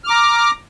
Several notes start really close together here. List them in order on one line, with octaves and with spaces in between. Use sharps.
F6 D6 A#5